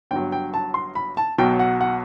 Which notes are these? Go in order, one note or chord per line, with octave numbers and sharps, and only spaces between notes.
G1 G2 F#3 G5
G5
A5
C6
B5
A5
B1 B2 F#3 G5
F#5
F#5